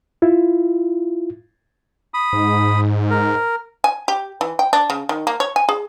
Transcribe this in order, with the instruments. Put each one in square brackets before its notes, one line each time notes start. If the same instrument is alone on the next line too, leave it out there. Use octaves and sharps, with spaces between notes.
[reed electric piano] E4 F4
[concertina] B5 D#6
[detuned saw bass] G#2
[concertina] A#4
[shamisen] G#5
G4
E3
G5
D4
C#3
D#3
A#3
C#5
G#5
G#4